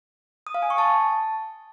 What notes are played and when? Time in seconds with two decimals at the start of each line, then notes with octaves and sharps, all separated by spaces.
0.47 D#6
0.54 F5
0.62 G#5
0.70 C#6
0.78 A5